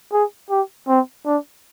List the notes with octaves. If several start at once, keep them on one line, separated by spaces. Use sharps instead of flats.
G#4
G4
C4
D4